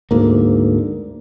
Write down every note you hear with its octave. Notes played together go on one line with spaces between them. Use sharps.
D2 G#2 A#3